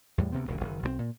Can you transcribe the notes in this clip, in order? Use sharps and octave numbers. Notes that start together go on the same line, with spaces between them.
E2 A2 G3
D2 C3 B3 C4
E1 C#2 A#2 D3
F#1 D#3
B1 G3 C4
A#2